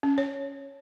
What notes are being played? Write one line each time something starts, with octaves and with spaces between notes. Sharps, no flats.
C#4
C#5